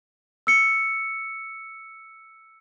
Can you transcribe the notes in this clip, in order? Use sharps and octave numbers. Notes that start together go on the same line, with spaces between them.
E6 C#7